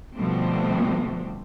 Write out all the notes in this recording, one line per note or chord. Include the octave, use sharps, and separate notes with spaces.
B2 D3 F3 G3 A3 C4